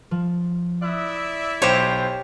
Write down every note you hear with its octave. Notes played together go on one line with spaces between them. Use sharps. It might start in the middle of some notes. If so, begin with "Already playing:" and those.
F3
E4 D5 E5 D#6 F#6
B1 G4 C5 C#5 E7